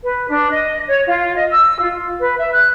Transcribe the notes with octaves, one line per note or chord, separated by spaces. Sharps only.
B4
D4
D#5
C#5
F4
D#5
E6
F4
B4
E5
F#6